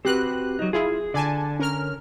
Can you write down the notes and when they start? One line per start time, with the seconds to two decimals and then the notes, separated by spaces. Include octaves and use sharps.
0.05 C4 F#4 G4 B4 F#6
0.59 F#3 D#4
0.73 E4 F4 G#4
1.14 D3 D5 G#5 A5
1.59 C#4 A#4 F6